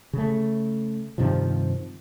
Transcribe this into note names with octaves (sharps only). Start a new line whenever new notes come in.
C#3 A3
G2 C3 D#3 F3